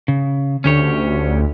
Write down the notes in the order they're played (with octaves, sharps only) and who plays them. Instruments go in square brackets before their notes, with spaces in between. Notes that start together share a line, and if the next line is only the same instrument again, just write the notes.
[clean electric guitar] C#3
[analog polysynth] D2 [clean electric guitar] C#4 G4 C#5